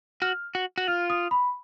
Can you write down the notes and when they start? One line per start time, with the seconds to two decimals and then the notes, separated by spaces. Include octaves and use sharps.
0.22 F#4 F6
0.55 F#4
0.78 F#4
0.87 F4 F6
1.10 D#6
1.31 B5